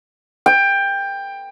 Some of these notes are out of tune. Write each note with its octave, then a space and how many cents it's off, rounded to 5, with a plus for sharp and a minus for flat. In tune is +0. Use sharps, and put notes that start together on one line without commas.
G5 +15